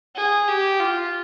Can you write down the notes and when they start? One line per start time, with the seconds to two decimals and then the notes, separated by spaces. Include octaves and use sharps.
0.16 G#4
0.48 G4
0.80 F4